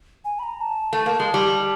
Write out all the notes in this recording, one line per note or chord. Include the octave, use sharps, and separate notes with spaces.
G#5
B5
A#5
A5
A3
A#3
G#3
G3